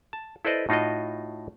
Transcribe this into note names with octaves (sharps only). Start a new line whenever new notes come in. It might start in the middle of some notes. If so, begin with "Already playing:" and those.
A5
E4 A4 B4 C5 D5 D#5
A2 D#4 F4 F#4 D#5